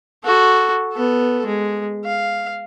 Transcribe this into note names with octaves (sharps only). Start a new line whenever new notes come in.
F#4 A4
B3 A4
G#3
F5